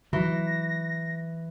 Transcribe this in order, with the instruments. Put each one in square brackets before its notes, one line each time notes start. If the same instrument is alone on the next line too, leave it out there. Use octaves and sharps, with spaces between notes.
[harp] E3 [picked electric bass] F#3 [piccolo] A#6